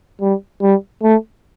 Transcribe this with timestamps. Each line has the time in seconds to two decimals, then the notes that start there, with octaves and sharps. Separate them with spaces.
0.21 G3
0.62 G3
1.03 A3